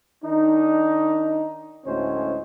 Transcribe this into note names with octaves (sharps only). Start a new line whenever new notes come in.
D#3 D4 D#4
D2 A2 G#3 C#4 C5